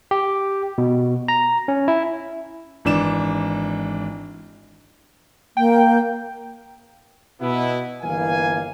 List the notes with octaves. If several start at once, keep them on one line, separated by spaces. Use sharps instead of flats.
G4
B2
A#5
C#4
E4
G#1 E3 D4 E7
A#3 G5
B2 B3 E4
G1 E3 A#3 F5 G#5